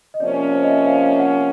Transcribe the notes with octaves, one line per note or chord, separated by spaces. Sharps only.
D#5
C3 F3 A#3 C#4 D5
D#5
E5
F5
F5
F#5